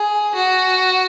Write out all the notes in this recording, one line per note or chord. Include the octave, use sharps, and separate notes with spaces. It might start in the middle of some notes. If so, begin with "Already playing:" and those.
Already playing: G#4
F#4